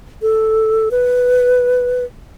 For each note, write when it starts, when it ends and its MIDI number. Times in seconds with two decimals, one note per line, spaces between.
0.22 0.89 69
0.91 2.04 71